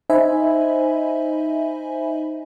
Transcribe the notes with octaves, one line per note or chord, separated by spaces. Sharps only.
D#4 C5 D#5 E5 G#5 B5